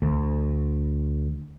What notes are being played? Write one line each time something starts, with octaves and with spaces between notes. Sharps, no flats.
D2